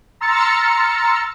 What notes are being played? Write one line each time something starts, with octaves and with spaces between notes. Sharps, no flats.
A#5 C6 E6 F6 A6 C#7